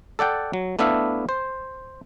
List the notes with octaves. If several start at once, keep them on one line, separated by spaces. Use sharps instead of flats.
A4 D5 F#5 G5
F#3
A3 B3 D4 E4 E5 F5
C5